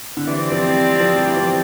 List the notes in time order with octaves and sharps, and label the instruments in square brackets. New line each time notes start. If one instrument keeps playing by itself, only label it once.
[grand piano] D3
[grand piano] E3 [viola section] C4 G4 D5
[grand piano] F3
G3
F3
G3
E3
F3